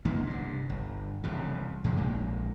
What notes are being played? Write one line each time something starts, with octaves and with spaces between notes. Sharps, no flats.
D3 A#3 B3
C2 G2
G1
E1 C2 F2 C#3
F#2 A#2 F3 G#3
A#1 G#3 A#3